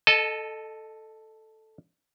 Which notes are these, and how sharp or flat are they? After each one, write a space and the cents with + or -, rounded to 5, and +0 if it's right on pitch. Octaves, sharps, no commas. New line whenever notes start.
A4 +0 D#5 -20 A5 -30